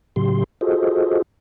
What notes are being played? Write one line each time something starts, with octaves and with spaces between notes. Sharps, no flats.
A2 C#3 F#3 G4 C6
F4 F#4 G#4 A4 C5 D#5